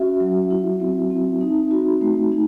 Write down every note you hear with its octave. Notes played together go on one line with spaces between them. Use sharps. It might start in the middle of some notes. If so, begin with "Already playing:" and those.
Already playing: C#4 F#4 E5
F#3
E4
C4
C4
D#4
F#4
A3
D#4